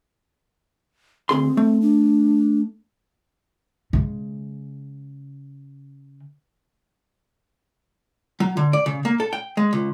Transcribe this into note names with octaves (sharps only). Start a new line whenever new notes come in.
D2 C4 G#4 C6
A3
D4
C#3 G#3
F#3
D3
D5
C#3
A#3
A4
G5
G#3
C#2